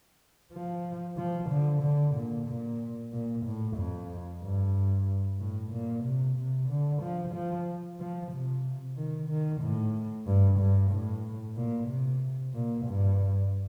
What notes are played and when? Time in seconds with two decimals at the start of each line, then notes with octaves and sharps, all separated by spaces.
0.53 F3
1.17 F3
1.50 D3
1.82 D3
2.15 A#2
2.47 A#2
3.12 A#2
3.45 A2
3.77 F2
4.42 G2
5.39 A2
5.72 A#2
6.04 C3
6.37 C3
6.69 D3
7.02 F3
7.34 F3
8.00 F3
8.32 C3
8.96 D#3
9.29 D#3
9.61 A2
10.26 G2
10.59 G2
10.91 A2
11.56 A#2
11.89 C3
12.54 A#2
12.86 G2